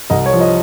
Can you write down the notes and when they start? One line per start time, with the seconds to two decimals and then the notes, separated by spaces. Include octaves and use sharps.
0.10 C2 D#5
0.26 C#5
0.33 F3
0.41 D#5